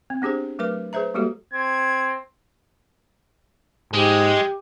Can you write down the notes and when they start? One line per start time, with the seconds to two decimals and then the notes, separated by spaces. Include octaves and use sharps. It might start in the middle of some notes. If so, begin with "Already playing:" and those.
0.10 C4
0.22 B3 D4 G4 G#4 C5
0.59 F#3 A3 A#4 B4 D6
0.93 G#4 B4 C5 E5 A#5
1.14 G3 G#3 A#3 F#4 G4 A4
1.53 C4 G#6
3.94 G#2 G#3 G4